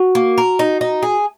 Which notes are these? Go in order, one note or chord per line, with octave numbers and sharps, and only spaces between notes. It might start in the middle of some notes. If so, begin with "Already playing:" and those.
Already playing: F#4
A#3
A#4
D#4
D#4
G#4